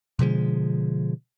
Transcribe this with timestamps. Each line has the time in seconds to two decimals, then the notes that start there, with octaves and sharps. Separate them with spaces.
0.19 B2 D3 F3 G#3